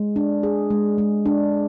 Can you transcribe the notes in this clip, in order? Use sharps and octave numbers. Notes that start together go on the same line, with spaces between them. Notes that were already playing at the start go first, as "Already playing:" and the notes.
Already playing: G#3
D4
G#4
G#3
G#3
D4